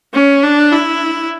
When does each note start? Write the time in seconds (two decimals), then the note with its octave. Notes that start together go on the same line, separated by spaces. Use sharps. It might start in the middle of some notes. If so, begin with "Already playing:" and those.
0.14 C#4
0.43 D4
0.72 E4